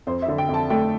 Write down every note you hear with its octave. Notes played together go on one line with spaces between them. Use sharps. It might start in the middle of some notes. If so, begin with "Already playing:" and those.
F2 C5
E5
D3
G5
F2
A5
A3 G5